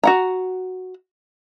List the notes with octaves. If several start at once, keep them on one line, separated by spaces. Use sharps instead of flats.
F#4 F#5 A#5